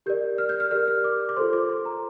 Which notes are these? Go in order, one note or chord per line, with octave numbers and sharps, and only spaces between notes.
G4 A#4 D5 G6
F6
G6
F6
G4 A#4 D5 F6
F6
D6
D6
F4 A4 C5 C6
D6
C6
A#5